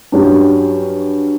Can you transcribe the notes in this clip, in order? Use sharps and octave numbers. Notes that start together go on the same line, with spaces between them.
G2 F#3 C#4 G4